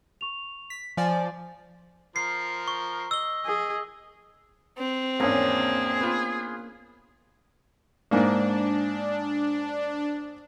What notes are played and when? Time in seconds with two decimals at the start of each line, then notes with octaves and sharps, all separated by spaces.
0.21 C#6 F7
0.70 B6
0.97 F3 D5 G#5
2.16 F3 A#4 C6 C7
2.68 C#6
3.11 D#5 E6 G7
3.45 G#4
4.78 C4
5.20 G#1 E2 A#3 C#4 D4 G#4
6.01 B3 F4
8.11 G#2 A#3 D4